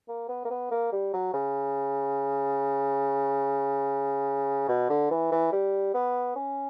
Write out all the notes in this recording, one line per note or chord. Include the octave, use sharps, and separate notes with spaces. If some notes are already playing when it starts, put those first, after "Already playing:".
A#3
B3
A#3
B3
A#3
G3
F#3
C#3
B2
D3
E3
E3
G3
B3
C#4